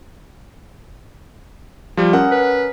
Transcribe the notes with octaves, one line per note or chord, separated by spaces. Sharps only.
F3 G3
C#4 A#4 F#5
B4